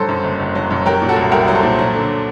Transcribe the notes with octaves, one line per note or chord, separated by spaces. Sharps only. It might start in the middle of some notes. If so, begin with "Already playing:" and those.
Already playing: G2 F#3 A4 C5
F#2
F#1
F#1
F#3
F#2
F#3 G4 A#4
A#2
F#4 A4
C2
C2 G4 A#4
F#3
A4 C5
A#2
F#3
D3